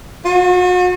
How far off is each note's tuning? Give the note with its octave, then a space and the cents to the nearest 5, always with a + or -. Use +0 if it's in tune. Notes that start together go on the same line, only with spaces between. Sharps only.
F#4 -40